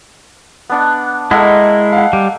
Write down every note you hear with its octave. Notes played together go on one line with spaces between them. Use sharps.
B3 D4 F#5
G#3 A#3 E4 A4 D#5 F#5
F5 F#5
G3